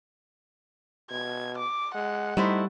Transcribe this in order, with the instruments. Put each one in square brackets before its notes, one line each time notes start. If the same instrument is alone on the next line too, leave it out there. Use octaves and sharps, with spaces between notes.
[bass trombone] B2 [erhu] G#6
[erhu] D6
[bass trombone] G#3 [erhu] F#5
[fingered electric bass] G3 [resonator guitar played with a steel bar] A3 E4 C5 [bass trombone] D#4